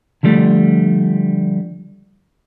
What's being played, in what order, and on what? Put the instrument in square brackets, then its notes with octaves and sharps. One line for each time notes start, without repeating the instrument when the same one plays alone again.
[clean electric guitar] D3 F3 G3 A3